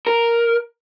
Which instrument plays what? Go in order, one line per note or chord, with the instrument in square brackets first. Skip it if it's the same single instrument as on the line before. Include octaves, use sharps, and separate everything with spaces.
[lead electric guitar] A#4